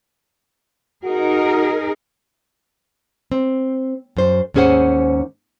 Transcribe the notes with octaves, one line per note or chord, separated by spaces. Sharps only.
D#4 F#4 G#4 A#4
C4
F#2 C5
D#2 G#2 C#4 G#4 C5 F#5